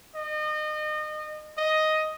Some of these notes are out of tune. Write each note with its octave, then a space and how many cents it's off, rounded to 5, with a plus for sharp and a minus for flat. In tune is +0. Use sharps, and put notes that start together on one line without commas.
D#5 -30
D#5 +5